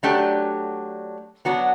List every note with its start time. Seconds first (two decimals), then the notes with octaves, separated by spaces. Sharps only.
0.03 F#3 A3 D4 G4
1.45 F#3 B3 D4 F#4